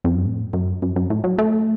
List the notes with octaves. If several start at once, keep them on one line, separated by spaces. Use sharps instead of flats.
F2
F#2
A2
F#2
F#2
F#2
A2
F#3
A3